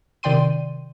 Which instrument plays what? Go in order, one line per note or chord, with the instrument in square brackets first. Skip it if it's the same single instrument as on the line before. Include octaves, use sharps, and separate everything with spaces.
[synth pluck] C3 D#3 D5 G5 C6 D#7